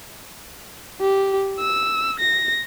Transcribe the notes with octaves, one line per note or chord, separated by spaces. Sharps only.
G4
E6
A#6